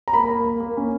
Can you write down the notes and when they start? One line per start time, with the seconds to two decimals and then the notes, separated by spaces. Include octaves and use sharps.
0.08 A#5
0.14 A#3 B5
0.29 A#3
0.44 A#3
0.60 A#3
0.77 C#4